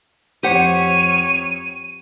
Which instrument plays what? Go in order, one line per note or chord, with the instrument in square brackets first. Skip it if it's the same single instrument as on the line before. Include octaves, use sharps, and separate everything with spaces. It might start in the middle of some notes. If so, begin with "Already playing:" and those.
[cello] F2 C#5 [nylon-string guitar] G4 C5 F#5 [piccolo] D#7